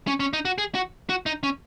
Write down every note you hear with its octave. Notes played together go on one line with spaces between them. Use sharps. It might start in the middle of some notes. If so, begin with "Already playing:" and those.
C#4
C#4
D#4
F#4
G#4
F#4
F#4
D#4
C#4